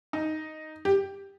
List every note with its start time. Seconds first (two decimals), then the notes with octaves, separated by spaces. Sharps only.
0.13 D#4
0.85 G4